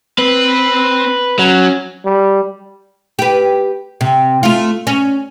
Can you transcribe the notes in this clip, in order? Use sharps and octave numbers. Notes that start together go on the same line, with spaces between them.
C4 B4
F#3 C#4
G3
G4 B4
C3
A3 F4
C#4